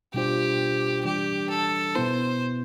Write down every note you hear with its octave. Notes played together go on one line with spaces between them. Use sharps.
B2 G3 D4 F4 G4 C5
E3 G3 D4 G4
A4
B2 B3 E4 C5